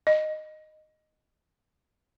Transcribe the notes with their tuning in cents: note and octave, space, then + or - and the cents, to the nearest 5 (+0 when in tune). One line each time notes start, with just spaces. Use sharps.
D#5 -10